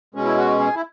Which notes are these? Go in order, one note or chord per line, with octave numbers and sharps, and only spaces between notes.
B2 G#3 C#4
E4
F#4
G#4
E4